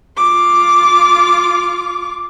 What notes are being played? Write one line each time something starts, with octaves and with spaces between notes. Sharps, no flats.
F4 D6